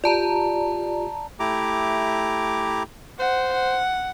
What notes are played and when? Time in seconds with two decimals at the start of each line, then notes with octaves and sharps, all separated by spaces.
0.04 F4 G4 D5 A5 A#5
1.40 A3 E4 G4 A#5 D6
3.20 C5 F#5
3.53 F#5